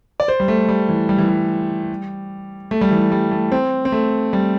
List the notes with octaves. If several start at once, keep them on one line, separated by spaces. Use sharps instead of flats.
D5
C5
G3
A3
G3
E3
G3
E3
G3
A3
G3
E3
G3
A3
C4
C4
A3
G3